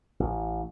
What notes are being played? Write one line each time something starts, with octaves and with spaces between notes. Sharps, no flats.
A1